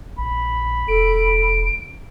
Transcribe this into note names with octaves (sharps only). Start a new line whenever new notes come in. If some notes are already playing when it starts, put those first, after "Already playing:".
A#1 B5
E1 A4 D7